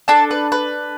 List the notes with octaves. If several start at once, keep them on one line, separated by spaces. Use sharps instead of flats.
D4 A4 A5
B4
B4